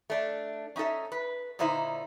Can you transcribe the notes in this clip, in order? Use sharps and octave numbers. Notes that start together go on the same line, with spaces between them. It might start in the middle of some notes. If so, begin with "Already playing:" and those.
A3 D4
C#4 D#4 F#4 A4 E5
B4
A#2 D3 D#4 E4 C5